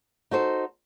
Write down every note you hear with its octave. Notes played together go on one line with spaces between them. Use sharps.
D#4 F#4 A4 C5